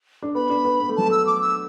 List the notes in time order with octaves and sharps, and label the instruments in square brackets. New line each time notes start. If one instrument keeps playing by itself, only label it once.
[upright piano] D4
[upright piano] B3 [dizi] B5
[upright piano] D4
B3
B3
A3
[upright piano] F#3 [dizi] A5
[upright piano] A3 [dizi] E6
[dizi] D6
E6